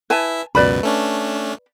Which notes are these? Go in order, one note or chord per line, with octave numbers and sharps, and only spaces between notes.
E4 B4 E5 G#5 A5
C#2 F#2 B2 B4 D5 B5
A3 C#4 D4